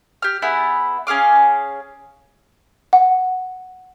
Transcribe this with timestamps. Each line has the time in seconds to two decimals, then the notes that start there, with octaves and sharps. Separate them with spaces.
0.22 G4 F6
0.42 B3 E4 G#4
1.07 C#4 G#4 F5 D6
2.93 F#5